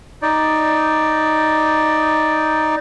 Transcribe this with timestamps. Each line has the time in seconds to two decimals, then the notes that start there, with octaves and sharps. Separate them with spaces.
0.22 D#4 D5